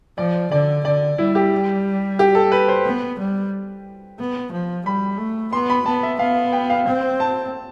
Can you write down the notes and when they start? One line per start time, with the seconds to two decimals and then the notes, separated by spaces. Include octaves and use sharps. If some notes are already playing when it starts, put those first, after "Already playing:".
0.18 F3 D5
0.52 D3 D5
0.85 D3 D5
1.18 G3 E4
1.35 G4
2.19 G4
2.35 A4
2.52 B4
2.68 C5
2.85 B3
3.19 G3
4.19 B3
4.52 F3
4.85 G3 B5
5.19 A3
5.53 B3 C6
5.70 B5
5.86 B3 A5
6.03 E5
6.19 B3 F5
6.53 G5
6.70 F5
6.87 C4
7.20 A5